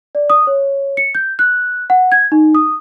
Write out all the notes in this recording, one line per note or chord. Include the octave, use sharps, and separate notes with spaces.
D5
D#6
C#5
C#7
G6
F#6
F#5
G#6
D#4
D#6